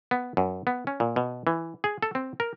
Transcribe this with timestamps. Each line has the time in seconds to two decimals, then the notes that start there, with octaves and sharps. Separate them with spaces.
0.11 B3
0.37 F#2
0.67 B3
0.87 C#4
1.00 A#2
1.16 B2
1.47 E3
1.84 G#4
2.02 A4
2.15 C4
2.40 A#4